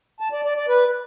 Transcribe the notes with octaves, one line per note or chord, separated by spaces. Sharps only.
A5
D5
D5
D5
B4